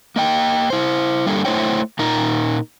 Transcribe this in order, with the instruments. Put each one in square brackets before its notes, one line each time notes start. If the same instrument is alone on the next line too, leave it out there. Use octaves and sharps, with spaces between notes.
[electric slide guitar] A#3 D#5 G5
E4 C5
G3 A#3 D4 A4
A3 E4 C5 C#5 G5
A#2 D#4 A#4 A#5